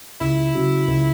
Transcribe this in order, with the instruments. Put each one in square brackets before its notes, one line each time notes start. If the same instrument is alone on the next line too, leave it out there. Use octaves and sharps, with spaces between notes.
[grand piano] C#2 [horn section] E4
[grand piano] C#3 F#3
C#2